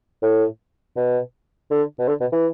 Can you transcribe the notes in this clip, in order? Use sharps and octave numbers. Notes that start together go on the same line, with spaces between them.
A2
B2
D3
B2
D3
B2
E3